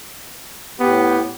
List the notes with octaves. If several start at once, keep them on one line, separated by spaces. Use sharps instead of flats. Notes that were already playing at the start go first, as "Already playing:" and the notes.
A2 B3 G4